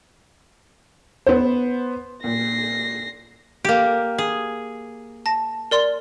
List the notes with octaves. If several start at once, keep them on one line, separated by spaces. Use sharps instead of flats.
B3 C5
A#2 A#6 C7
A#3 G4 D7
G#4
A5 A#6
A#4 D5 C6